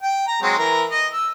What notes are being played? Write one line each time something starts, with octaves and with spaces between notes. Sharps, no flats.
G5
A#5
F#3 G#3 C4
E3 A#4 A#5
D#5
E6